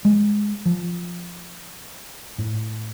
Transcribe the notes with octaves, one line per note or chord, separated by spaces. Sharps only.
G#3
F3
A2